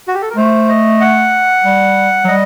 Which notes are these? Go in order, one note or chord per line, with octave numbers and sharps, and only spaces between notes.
F#4
G4
A4
A#4
A3 C5
D#5
F#5
G3
F#3
G3 D#5